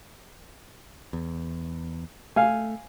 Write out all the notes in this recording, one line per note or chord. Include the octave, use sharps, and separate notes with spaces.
E2
A3 F5 G#5